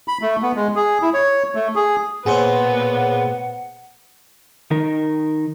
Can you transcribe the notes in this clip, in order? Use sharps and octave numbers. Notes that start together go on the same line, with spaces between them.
B5
A3
B3
G#3
G#4
E4
C#5
A3
G#4
A#2 B3 G#4 C5 C#5 F#5
D#3 D#4 A#4